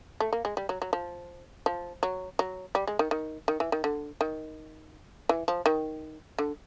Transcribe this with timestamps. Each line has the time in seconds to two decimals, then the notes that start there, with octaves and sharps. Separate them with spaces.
0.20 A3
0.33 A#3
0.45 G#3
0.57 G3
0.69 F#3
0.82 F#3
0.93 F3
1.66 F3
2.03 F#3
2.39 F#3
2.75 G3
2.87 G#3
2.99 D#3
3.11 D#3
3.48 D#3
3.60 E3
3.72 D#3
3.84 D3
4.21 D#3
5.29 E3
5.48 F3
5.66 D#3
6.39 D3